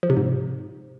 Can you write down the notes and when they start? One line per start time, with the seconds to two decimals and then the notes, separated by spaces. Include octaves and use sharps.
0.03 F3
0.10 C3
0.17 G#2